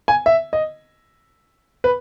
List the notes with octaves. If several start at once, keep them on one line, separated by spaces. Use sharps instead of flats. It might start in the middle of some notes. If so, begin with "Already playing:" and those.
G#5
E5
D#5
B4